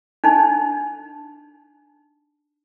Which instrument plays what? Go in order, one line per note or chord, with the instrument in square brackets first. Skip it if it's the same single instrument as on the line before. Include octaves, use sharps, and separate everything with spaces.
[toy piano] D4 D#4